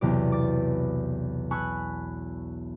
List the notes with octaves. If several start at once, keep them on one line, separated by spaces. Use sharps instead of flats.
B1 E2 C3 D5
D6 A6
G#5 A5 B5 C#6 E6 F#6